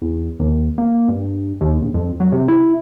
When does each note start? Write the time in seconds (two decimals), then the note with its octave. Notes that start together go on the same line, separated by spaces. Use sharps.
0.02 E2
0.40 D#2
0.78 A#3
1.08 G2
1.61 D#2
1.82 A#1
1.94 F2
2.20 F#3
2.32 C3
2.48 E4